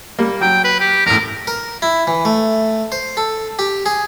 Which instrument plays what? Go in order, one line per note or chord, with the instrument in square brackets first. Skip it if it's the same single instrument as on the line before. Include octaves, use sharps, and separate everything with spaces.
[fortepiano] G3 A#3
[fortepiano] F#3 [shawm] G5
[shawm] B4
G4
[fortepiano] E2 A2 [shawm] A#4
[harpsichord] A#4
E4
E3
A3
C5
A4
G4
G#4